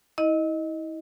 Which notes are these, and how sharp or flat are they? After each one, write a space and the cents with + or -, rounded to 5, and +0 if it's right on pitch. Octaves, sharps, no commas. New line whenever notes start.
E4 -35 D#5 +0